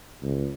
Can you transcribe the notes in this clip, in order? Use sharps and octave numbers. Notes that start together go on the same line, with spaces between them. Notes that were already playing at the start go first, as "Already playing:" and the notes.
C#2